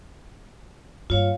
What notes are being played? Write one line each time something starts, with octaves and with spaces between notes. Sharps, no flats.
G2 A#3 F4 C#5 F5